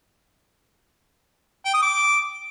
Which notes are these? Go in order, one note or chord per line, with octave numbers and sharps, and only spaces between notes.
G5
D#6
D6